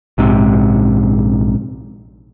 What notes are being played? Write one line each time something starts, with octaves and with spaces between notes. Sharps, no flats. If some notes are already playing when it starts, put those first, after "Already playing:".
A#1 G#2 C3